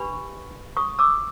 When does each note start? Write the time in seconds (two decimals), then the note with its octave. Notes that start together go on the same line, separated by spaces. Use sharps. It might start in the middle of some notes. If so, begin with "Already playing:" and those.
Already playing: D4 G4 B4 B5 C#6
0.77 C#6 D#6
0.99 D6 E6